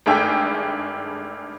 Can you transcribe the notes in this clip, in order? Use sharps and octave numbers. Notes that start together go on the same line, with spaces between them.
G#1 G2 A3 G#4 E5 G5